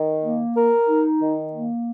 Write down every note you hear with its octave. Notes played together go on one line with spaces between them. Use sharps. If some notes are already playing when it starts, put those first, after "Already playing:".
Already playing: D#3
A#3
A#4
D#4
D#3
A#3